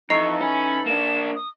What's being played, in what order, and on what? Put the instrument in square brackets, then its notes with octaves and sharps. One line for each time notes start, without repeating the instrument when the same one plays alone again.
[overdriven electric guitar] F2 [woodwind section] E3 D#4 A4 [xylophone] D#5 A#5 C7 [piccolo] C#6
[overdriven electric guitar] C#4 [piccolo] B5
[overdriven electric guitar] A#3 D4 [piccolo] E7
[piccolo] D#6